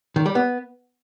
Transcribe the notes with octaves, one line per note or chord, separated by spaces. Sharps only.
D#3
G3
B3